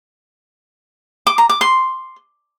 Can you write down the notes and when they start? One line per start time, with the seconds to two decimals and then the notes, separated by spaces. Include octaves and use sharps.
1.27 D6
1.38 A#5
1.49 D6
1.61 C6